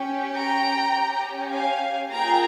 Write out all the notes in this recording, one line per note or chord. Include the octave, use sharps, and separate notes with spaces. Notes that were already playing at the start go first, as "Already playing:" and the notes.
Already playing: C#4 G4
G5 A#5
C#4 G4
F5 G#5
A#3 F4 G#4 G5 A#5